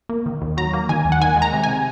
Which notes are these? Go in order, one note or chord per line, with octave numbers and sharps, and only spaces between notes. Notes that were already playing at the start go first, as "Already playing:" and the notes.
A#3
D#3
D#2
F#3 A#5
A#3
D#3 G#5
D#2
F#5
D#3 G#5
G#3
A#5
C3
G#5